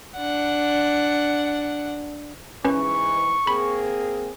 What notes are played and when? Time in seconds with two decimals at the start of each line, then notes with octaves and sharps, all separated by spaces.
0.16 D4 F#5
2.65 G#2 E3 C#4 B4 C#6
3.47 A#3 C4 G#4 B5